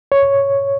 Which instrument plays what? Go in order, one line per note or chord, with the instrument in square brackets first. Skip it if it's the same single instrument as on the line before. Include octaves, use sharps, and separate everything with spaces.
[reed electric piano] C#5